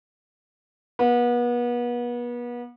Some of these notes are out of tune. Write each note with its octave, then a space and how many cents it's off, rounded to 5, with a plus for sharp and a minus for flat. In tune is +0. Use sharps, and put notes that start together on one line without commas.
B3 -35